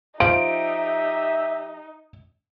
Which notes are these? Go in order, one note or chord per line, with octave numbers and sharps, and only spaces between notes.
F3 D#4 G4 E5 D7